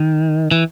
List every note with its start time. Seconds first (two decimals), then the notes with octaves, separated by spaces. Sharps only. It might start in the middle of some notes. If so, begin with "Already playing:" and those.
Already playing: D#3
0.51 E3